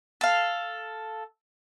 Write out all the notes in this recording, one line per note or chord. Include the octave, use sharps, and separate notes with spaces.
A4 F5